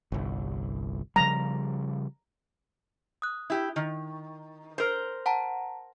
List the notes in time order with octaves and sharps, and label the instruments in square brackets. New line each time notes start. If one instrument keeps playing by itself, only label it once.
[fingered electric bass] G1 C2
[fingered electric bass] C#3 F3 G3 [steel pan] A#5
[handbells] D#6 F#6
[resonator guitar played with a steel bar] E4 G4
D#3
A#4 C5
[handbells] F#5 A5 A#5